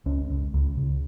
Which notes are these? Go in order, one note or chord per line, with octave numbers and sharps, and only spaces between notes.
C#2 C#4
C#2
C#2
C#3